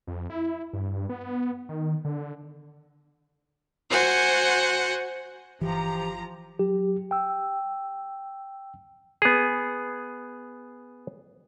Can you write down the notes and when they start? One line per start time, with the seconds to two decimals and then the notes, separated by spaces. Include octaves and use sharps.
0.07 F2
0.30 E4
0.73 G2
1.09 B3
1.69 D#3
2.05 D3
3.90 F#4 C5 F#5 G#5
5.61 G1 E3 F3 G4 A#5
6.59 F#3 G4
7.11 G5 E6
9.22 B3 G#4